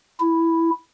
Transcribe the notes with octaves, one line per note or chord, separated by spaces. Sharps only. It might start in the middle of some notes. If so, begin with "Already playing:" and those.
E4